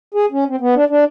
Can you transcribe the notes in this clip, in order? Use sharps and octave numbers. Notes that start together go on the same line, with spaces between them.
G#4
C#4
C4
B3
D4
D4